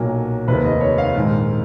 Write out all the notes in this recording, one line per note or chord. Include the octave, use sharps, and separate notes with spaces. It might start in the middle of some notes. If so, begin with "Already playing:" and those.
Already playing: B1 A#2 F#3 A#3
F1 D#2 D#3 B4
D#5
C#5
F5
A#1 G#2 D#3